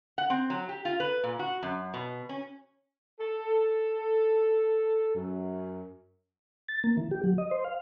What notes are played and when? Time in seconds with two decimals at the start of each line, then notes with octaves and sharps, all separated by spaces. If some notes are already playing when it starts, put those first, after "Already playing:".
0.18 F#5
0.30 C4
0.50 F#3
0.69 G4
0.85 F4
1.00 B4
1.24 A#2
1.39 F#4
1.63 F#2
1.94 B2
2.29 C#4
3.20 A4
5.15 F#2
6.68 A6
6.84 A#3
6.97 E3
7.11 G4
7.24 F#3
7.38 D#5
7.51 C5
7.64 F5